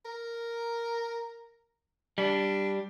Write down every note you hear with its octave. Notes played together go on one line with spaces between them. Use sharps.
A#4
G3 D4